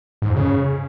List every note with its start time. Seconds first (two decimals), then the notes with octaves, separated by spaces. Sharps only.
0.22 G#2
0.29 F2
0.36 C#3